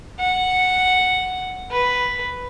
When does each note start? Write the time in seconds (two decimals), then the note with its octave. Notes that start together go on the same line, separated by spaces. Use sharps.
0.20 F#5
1.71 B4